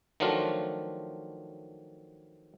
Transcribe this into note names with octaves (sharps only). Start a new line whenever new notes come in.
D#3 F3 F#3 A3 D4 F4